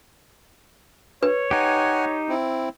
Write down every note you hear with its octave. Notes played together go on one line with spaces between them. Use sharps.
B4 C#5
D#4 G4 F#5 G#5
C4 E4